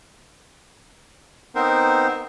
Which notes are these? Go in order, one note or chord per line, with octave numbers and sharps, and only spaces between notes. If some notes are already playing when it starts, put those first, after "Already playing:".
B3 C4 D#4 A#4 C5